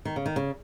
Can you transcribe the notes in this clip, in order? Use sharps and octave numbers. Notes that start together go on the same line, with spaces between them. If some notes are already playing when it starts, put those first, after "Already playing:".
D#3
C#3
D#3
C#3